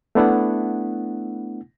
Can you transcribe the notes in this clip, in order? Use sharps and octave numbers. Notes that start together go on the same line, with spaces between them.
A3 B3 D4 E4 F#5